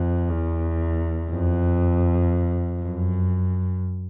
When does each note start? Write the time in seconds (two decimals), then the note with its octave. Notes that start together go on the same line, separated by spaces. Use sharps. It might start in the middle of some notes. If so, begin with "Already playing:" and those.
Already playing: F2
0.29 E2
1.30 F2
2.81 F#2